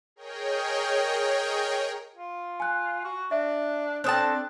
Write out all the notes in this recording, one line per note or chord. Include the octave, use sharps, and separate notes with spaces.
G#4 A#4 C#5 D#5 G5
F4
G#5 F#6
F#4
D4 E5
C4 D4 A4 G5 A5 D#6 F#6